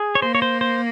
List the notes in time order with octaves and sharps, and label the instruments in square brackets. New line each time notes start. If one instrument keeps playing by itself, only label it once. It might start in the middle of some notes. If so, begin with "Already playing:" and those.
Already playing: [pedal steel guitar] G#4
C#5
[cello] A#3 [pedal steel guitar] C5
[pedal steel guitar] C#5
C5
C5